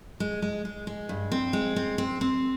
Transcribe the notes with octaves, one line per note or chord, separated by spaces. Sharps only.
G#3
G#3
G#3
G#3
G2
C4
G#3
C4
C4
C4